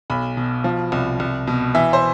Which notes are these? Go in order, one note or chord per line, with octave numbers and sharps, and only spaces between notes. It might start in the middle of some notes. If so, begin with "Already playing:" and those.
B1 B5
B2
F3
C2
C2
B2
E3 E5
C5